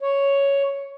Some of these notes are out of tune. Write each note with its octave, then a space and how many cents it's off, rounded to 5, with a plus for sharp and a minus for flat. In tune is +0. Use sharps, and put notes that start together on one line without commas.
C#5 +5